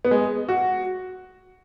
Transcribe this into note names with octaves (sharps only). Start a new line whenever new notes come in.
B3
G#3
F#4